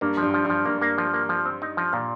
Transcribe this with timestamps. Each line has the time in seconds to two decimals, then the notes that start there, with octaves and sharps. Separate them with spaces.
0.01 G2 A#3
0.17 F3
0.22 G2
0.34 F3
0.45 G2
0.50 F3
0.65 G2 A#3
0.81 A#3
0.98 F3
1.14 A#3
1.29 F3
1.46 C4
1.62 D#4
1.77 F3
1.93 A#2